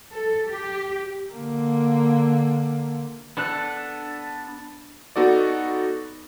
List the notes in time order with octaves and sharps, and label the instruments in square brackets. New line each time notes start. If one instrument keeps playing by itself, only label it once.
[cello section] A4
G4
[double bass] D3 A#3
[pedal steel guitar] B3 D4 A4 F#6
[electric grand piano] B3 D#4 F#4 A4 D5